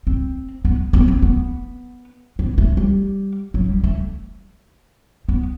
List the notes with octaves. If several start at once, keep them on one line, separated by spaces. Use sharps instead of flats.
C4
B3
B3
C4
B3
B3
A3
G3
F#3
G3
A3
B3